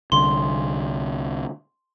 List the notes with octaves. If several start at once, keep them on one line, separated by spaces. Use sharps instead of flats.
C2 D3 C6